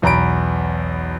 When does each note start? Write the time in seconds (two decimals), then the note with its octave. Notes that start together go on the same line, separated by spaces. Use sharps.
0.02 B1 E2 A#5 B5 D7